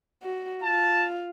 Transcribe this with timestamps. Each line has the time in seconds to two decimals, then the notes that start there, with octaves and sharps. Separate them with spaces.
0.23 F#4
0.63 F4 A5